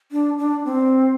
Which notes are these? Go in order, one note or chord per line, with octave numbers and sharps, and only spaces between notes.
D4
D4
C4